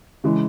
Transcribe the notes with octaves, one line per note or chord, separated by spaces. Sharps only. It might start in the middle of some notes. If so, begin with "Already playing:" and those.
C#3 E3 G#3